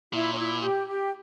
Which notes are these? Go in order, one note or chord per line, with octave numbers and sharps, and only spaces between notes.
A#2 E4
C#4
E4
G4
G4